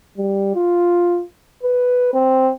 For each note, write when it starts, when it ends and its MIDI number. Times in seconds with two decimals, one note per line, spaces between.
0.17 0.52 55
0.55 1.23 65
1.63 2.12 71
2.14 2.51 60